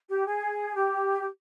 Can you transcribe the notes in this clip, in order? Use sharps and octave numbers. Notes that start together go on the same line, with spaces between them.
G4
G#4
G4